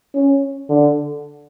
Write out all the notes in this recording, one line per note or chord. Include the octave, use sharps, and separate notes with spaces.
C#4
D3